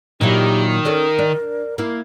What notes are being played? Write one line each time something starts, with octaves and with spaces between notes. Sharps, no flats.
A#2 D#3 F#3 E4 G4
C#4 D4 A4 A#4
D4
A#3 E4 A#4